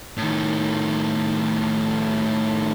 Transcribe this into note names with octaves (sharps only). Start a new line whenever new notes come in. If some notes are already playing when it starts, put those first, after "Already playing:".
A2 D#3